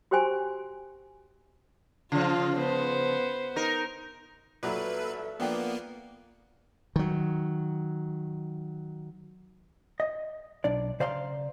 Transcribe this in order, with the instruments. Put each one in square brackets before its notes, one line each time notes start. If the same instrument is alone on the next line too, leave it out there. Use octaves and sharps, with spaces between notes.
[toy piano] F#4 G4 C5 G5 G#5 C6
[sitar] C#3 F3 [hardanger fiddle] F4
[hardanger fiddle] B3 C5
[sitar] D#4 A#4
[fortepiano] A#2 F#3 [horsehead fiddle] A4 E5 [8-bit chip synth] B4
[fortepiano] F3 D4 G5 [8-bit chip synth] A#3 B3
[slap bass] D#3 F#3
[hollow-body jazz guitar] D#5
B1 D4 D5
C#3 C5 D5 F5 A#5 C6